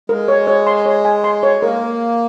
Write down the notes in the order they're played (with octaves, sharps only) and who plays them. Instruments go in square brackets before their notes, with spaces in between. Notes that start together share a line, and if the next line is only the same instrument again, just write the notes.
[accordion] G#3 [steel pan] A#4
[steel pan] C#5
C#5
C6
C#5
G#5
C6
C#5
[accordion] A#3 [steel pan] A#4